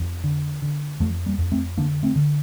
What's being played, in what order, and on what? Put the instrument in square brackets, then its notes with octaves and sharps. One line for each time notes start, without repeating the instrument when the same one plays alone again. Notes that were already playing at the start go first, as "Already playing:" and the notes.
Already playing: [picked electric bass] F2
D3
D3
F2 F3 A3
G3 A#3
F2
A3 C4
D3 A#3 D4
A3 C4
D3